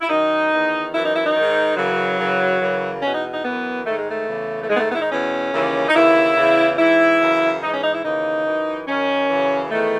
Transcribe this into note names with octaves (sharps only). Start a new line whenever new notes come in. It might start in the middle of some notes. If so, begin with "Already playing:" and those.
E4
F#2 D#3 D#4
E2 D#3
F#2 E3 E4
D#4
E4
D#4
G#2 D#3
F#2 C#3 E3 F#3
F#2 C#3 E3
F#2 C#3 E3
E2 B2 C#4
D#4
D#4
F#2 E3 B3
G#2 D#3 A3
G#3
A3
E2 C#3 E3
A3
G#2 D#3 G#3 B3
A3
B3
E4
D#4
E2 B2 C#4
D#2 C#3 E3
D#4
D#2 C#3 E3 E4
E2 C#3 E3
G#2 E3 E4
F#2 C#3 E3
G#2 E3 D#4
C#4
D#4
E4
D#2 C#3 E3 D#4
F#2 E3
F#2 D#3 C#4
F#2 C#3 E3
E2 D#3 A3